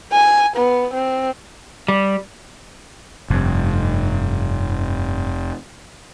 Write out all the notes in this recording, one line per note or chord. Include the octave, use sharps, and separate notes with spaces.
G#5
B3
C4
G3
F1 G2